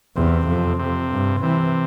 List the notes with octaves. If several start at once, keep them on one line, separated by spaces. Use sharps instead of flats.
E2 C3
F2
F2 C3
G2
C3 E3